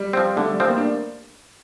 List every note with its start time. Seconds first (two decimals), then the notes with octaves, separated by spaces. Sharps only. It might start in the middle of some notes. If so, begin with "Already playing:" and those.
Already playing: G3
0.13 F3 C4
0.36 D3 A3
0.52 G3
0.60 F3 C4
0.68 A#3
0.77 D4